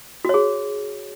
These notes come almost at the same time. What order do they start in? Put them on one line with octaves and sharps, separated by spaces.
F#4 C#5 G#4